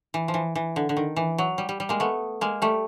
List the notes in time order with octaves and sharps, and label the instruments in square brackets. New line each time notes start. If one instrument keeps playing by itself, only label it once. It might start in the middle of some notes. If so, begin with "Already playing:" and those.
[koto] E3
F3
E3
E3
D3
D3
D#3
E3
F#3
G3
G3
G3
G#3 A#3
A3 B3
G#3 A#3
G3 A3